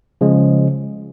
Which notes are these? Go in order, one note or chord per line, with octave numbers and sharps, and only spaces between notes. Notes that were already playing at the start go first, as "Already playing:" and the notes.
C#3 F3 G#3